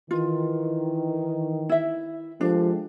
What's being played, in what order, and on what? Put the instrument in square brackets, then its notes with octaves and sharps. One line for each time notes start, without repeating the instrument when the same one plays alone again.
[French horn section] D#3 [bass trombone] E3 [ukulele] F4
[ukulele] E4 E5
[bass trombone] F3 [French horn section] G#3 G4 A4 [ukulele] D4